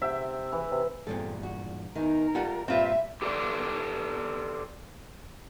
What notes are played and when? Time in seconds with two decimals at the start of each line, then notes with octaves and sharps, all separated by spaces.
0.02 C3 E5 G5
0.52 E3
0.71 C3
1.07 E2 G2 A#2 C4 A4
1.43 F#4
1.95 E2 D#3 A#4
2.35 G3 F4 A4 F#5
2.68 G2 A#2 G3 C4 F4 B4 E5
3.22 G4 A4 C5 D5